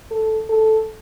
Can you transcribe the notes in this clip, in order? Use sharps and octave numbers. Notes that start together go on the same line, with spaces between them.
A4
A4